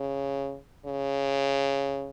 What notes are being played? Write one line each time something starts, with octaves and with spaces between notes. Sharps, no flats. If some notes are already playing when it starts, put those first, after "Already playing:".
Already playing: C#3
C#3